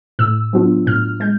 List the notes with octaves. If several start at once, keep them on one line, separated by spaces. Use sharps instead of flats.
A2 E6
F#3 B3 D4 F4
A2 F6
G#3 G6